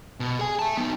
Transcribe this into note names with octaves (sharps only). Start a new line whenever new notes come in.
B2
G#4 G#5
E5 A5
B3 D#4